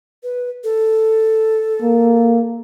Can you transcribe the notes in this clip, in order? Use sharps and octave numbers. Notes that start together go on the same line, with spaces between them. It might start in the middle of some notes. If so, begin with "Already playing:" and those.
B4
A4
A#3